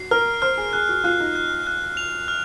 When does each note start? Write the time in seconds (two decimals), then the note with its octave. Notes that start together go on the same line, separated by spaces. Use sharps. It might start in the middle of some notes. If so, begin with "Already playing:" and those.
Already playing: F#4 C7
0.11 A#4 F6
0.42 C5 F6
0.58 G#4
0.73 G#4 F#6
0.89 F#4
1.04 F4 F#6
1.20 D#4
1.36 F#6
1.67 F#6
1.97 F7
2.28 F6